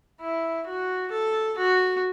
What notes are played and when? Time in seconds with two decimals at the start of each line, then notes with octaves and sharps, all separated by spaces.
0.20 E4
0.67 F#4
1.11 A4
1.58 F#4